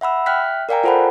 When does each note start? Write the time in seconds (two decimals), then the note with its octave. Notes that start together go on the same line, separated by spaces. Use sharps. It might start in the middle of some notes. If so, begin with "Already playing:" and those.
0.01 E5 F#5 B5 E6
0.26 E5 G5 F6 F#6 B6
0.69 A#4 D5 F5 G5 G#5 A#5
0.84 F4 A4 C5 F#5 A5 B5